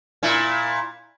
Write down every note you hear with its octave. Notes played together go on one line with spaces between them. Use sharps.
A#2 E4